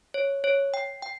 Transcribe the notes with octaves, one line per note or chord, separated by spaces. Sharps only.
C#5
C#5
G5
G5